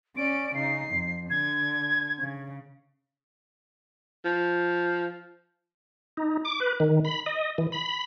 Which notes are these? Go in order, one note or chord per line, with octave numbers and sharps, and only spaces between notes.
C#4 D5 D7
C#3 D#4 C7
F2
D3 G#6
C#3
F3
D#4
D6
B4
D#3
B5
D#5
E3
B5